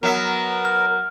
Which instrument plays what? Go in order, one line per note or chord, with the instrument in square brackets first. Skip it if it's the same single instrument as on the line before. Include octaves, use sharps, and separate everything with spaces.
[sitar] F#3 E5 [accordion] B3 A#4
[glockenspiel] F6